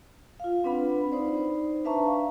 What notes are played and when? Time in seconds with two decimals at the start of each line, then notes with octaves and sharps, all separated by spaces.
0.40 F4 F5
0.64 C4 D4 B4 F#5 B5
1.12 D#4 C5 D5
1.85 D4 B4 E5 A5 A#5 C#6
2.07 F5